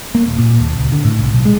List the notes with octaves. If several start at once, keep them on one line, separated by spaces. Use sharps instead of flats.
A#3
D#1
A#2
D#2
C#2
D3
A2
C2
B1
G#3